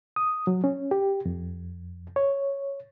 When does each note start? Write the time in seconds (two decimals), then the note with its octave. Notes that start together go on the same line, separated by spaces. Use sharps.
0.16 D#6
0.47 F#3
0.64 C#4
0.91 G4
1.26 F2
2.16 C#5